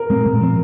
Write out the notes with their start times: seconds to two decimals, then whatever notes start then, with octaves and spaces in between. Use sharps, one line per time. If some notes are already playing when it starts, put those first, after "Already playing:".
Already playing: A#4
0.09 A#2 G#3 C4
0.25 A#2
0.41 F3 C4